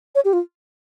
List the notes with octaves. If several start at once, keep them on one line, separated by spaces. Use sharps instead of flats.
C#5
G4
F4